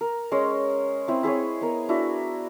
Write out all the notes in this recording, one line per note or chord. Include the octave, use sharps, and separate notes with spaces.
A#4
G#3 C#4 C6
C4 E4 B4
E4 G#4 B4 C#5
B3 A#4
D4 E4 F#4